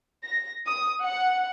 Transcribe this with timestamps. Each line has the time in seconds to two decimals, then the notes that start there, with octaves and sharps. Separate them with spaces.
0.24 A#6
0.65 D#6
1.03 F#5